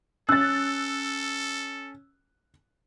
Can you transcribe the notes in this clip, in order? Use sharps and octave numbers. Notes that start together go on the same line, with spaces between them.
C#4 A4 E6 F#6 A6